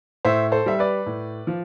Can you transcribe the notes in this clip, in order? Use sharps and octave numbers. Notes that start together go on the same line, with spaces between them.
A2 C5 E5
A4 C5
G3 E5
B4 D5
A2
F3